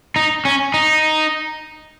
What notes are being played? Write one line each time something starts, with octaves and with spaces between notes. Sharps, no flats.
D#4
C#4
D#4